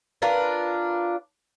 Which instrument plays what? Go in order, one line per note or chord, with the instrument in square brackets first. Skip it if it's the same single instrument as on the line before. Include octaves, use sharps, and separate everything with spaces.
[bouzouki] D4 F4 A#4 B4